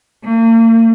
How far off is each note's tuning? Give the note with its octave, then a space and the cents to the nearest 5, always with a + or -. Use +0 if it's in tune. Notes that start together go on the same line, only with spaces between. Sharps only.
A#3 -40